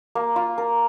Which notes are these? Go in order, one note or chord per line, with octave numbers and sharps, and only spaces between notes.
A#3
F4
A#4